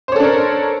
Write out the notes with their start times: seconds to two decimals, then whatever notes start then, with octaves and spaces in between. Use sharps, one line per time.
0.08 C5
0.12 C#5
0.16 A4
0.20 D4
0.24 A#4